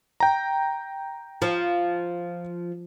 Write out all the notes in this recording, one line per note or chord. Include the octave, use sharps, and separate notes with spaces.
G5 A#5
F3